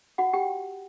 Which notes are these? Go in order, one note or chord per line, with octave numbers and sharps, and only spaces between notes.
F#4 F#5
G4 G5